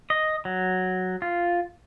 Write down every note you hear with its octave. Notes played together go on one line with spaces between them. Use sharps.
D#5
F#3
F4